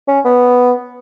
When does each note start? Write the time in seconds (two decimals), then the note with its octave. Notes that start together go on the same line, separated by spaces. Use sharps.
0.08 C#4
0.25 B3